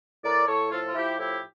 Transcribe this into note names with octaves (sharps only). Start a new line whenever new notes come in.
A2 A#4 D5
A2 A4 C#5
F3 F4 A4
F4
F3 E4 G4
A2 E4 G4